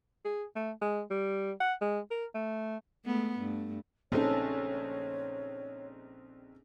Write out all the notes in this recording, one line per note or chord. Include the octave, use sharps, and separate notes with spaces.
G#4
A3
G#3
G3
F#5
G#3
A#4
A3
G#3 A3 B3
G2 A3
A#1 C4 C#4 D#4 A4 C#5